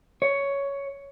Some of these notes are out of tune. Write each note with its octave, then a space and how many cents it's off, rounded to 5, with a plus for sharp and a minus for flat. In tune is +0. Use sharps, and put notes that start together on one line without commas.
C#5 +10